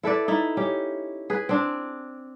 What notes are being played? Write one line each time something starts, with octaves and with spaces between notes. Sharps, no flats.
E4 A4 B4 D5
D#4 E4 E5
C#4 G4
G#4 B4
C4 D4